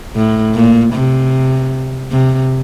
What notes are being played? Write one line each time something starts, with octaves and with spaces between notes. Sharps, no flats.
A2
A#2
C3
C3